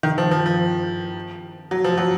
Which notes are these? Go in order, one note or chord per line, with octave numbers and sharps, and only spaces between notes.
D#3
F3
F3
F3
F#3
F3
F#3